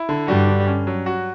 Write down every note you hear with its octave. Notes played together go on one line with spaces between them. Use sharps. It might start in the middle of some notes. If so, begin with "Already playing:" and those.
Already playing: E4
D3
G2 G3 F#4
D3
C#4
F#3
F#4